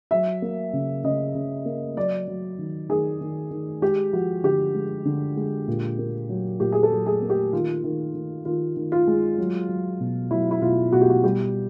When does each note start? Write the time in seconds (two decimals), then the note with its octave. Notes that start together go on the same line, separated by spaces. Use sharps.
0.11 F#3 E5
0.42 A#3
0.73 C#3
1.04 C#3 D#5
1.35 C#3
1.66 A#3
1.97 F#3 D5
2.27 F#3
2.58 D#3
2.89 D#3 G#4
3.21 D#3
3.51 D#3
3.82 G#3 G4
4.13 F3 F#4
4.44 D3 G4
4.75 G#3
5.05 D3
5.37 G#3
5.68 A#2
5.99 A#3
6.29 F#3
6.60 A#2 G4
6.72 G#4
6.83 A4
6.91 F#3
7.06 G#4
7.22 A#3
7.30 G4
7.53 D#3 F4
7.84 D#3
8.15 D#3
8.45 D#3 F4
8.76 D#3
8.92 F4
9.07 G#3
9.38 F#3
9.69 F#3
10.00 B2
10.31 F#3 E4
10.51 E4
10.62 B2 F4
10.93 B2 F#4
11.01 G4
11.09 F#4
11.24 G3 G4